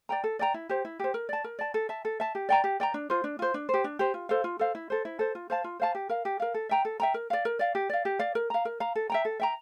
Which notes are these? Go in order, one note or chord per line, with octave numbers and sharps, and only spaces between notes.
D5 G5 A#5
A4
D5 G5 A#5
E4
G4 C5
E4
G4 C5
A#4
D5 A5
A#4
D5 A5
A4
E5 A5
A4
E5 A5
G4
D5 G5 A#5
G4
D5 G5 A#5
D4
F4 C5
D4
F4 C5
D4
G4 C5
D4
G4 C5
F4
A4 C5 F5
F4
A4 C5 F5
E4
A4 C5
E4
A4 C5
F4
C5 F5 A5
F4
C5 F5 A5
G4
A#4 F5
G4
A#4 F5
A4
E5 G5 A#5
A4
E5 G5 A#5
A#4
D5 F5
A#4
D5 F5
G4
D5 F5
G4
D5 F5
A#4
F5 A#5
A#4
F5 A#5
A4
E5 G5 A#5
A4
E5 G5 A#5